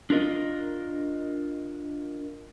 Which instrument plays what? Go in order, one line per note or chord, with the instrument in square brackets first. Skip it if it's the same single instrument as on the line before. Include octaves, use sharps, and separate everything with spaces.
[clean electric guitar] D4 F4 A#4 D#5